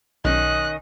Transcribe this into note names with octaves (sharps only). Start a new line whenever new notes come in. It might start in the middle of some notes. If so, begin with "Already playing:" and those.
B1 D#3 C#4 D#5 F#6